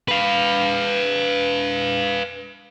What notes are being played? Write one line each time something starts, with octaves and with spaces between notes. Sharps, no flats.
B4 F5